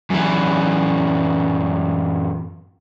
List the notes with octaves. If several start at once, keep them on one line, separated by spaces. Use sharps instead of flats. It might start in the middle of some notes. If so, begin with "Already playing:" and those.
F#2 E3